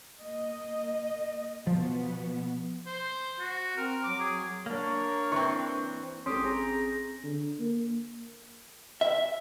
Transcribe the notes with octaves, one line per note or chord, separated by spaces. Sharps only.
A#3 D#5
B2 F3 B3
C5
F#4
C4 A#4
F#3 D6
G#4
A#3 D4 A#4 C#5
E3 C4 C#6
G#1 C4 C#4 G4 A4 C6 D#6 G6
G#4 A#5
D3
A#3
E5